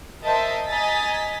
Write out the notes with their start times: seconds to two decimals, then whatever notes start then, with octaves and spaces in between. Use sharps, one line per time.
0.24 A#4 C5 D#5 E5 A5
0.67 D#5 G#5 A#5 A6 B6